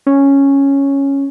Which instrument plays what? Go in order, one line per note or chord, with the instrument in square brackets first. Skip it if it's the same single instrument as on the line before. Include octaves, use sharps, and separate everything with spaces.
[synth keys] C#4